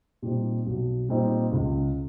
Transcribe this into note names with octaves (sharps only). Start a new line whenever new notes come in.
A#2 G3 C4 D#4
B1
A#2 G3 C4 D#4
C#2